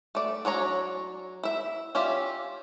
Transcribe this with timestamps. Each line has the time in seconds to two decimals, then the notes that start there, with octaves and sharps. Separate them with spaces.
0.15 A3 D5
0.45 F#3 D4 C#5 A#5
1.43 E4 E5
1.95 C#4 F4 G4 D5 E5